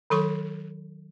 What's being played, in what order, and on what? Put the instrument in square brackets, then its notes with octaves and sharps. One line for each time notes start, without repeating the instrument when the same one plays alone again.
[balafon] D#3 F#3 A4 C6 C#6